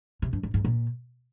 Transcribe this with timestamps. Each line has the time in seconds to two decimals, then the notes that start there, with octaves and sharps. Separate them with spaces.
0.22 C3
0.33 G2
0.43 G#2
0.54 G#2
0.65 A#2